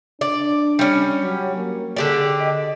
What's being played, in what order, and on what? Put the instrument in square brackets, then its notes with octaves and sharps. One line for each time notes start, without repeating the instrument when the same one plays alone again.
[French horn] D4 [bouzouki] D5
[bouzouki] G3 C#4
[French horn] F#3
A#3
[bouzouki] D3 G4 D5 [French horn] G#4
[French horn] D#5